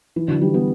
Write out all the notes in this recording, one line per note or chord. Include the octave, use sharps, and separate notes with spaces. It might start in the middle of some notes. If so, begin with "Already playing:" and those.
E3
D3 F#3
E3 G3
G3 B3